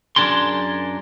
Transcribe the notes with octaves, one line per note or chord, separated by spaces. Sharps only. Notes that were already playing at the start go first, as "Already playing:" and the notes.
F#2 D3 D4 G#4 A#4 C6